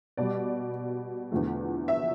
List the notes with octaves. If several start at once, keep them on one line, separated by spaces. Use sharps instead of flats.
B2 G3 D5
E2 D3 F3 A3
E5